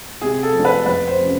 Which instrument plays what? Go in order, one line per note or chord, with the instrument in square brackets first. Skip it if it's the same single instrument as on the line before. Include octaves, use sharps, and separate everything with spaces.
[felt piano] C3 G#4
A4
F3 A3 D4
B4
F2 B4
C5
C3 F3 A3 C#4